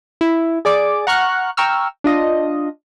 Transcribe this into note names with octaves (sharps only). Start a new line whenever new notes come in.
E4
G#4 D5 D6
F#5 A#5 C#6 F6 F#6
G5 A#5 C#6 E6 F6
D4 F4 D#5